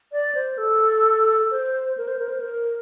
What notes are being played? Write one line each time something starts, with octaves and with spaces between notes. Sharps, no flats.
D5
C5
A4
C5
A#4
C5
A#4
C5
A#4